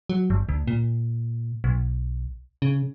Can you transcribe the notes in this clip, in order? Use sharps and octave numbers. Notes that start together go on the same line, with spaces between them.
F#3
G1
D2
A#2
B1
C#3